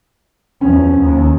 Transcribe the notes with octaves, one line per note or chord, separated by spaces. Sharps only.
E2 F3 C#4
D#2